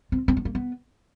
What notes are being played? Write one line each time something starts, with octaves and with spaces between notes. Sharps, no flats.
C4
C4
B3
A#3
B3